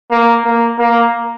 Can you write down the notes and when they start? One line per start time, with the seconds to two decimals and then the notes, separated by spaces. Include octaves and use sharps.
0.11 A#3
0.45 A#3
0.78 A#3